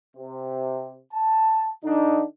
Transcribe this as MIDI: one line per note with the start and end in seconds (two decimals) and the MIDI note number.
0.17 0.98 48
1.13 1.69 81
1.84 2.23 50
1.84 2.23 62
1.84 2.23 63